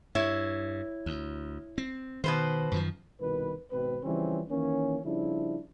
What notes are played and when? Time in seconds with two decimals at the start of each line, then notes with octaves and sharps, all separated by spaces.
0.15 G2 E4 C#5
1.06 D2
1.78 C4
2.24 B2 D#3 B4 C5
2.72 F#2 D#3 F3
3.20 C2 B2 D#3 B4
3.71 G#1 B2 C4 B4
4.03 C#3 E3 F3 G3 C4 C#4
4.50 D#3 E3 A#3 C#4
5.05 C#3 F3 G3 D4 E4